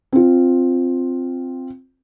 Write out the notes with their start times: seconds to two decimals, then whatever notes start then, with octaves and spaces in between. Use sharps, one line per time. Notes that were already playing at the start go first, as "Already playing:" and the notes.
0.12 C4 F4